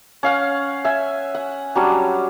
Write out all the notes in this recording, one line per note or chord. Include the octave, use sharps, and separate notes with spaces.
C#4 F5 F#5
E5 G#5
F#5
F#3 G3 C#4 D4